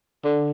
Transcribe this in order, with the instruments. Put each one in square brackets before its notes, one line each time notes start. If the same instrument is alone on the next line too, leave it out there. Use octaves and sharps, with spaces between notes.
[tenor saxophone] D3